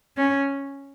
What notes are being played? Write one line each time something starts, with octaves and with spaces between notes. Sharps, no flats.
C#4